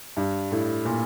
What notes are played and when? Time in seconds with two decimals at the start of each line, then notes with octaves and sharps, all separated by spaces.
0.17 G2
0.51 A2
0.85 A#2